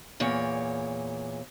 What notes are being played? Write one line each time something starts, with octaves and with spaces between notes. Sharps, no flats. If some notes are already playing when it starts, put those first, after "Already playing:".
E2 A#2 C#5